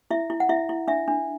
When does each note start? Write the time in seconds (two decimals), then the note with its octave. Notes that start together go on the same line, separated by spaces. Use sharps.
0.11 E4 E5
0.30 E4
0.40 F#5
0.49 E4 E5
0.69 E4
0.88 D4 E5
1.08 D4